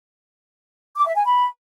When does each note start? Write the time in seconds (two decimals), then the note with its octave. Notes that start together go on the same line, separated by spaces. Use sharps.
0.96 D6
1.06 E5
1.15 G#5
1.25 B5